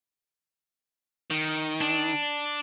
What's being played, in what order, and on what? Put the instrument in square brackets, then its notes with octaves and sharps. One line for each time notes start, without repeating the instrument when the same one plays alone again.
[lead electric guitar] D#3
[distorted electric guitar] D4